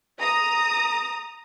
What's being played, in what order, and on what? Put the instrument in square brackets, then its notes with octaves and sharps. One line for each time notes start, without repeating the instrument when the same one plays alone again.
[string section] A#5 D#6